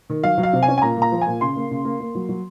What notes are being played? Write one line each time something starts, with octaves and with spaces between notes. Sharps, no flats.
D#3
F#3 F5
F#3
F5
C3
G#5
C#4
G#5
A#2 A#5
A#2
A#5
F3
A#2 G#5
C#3 C6
A#3
C#3
A#3
A#3
F#3
F#3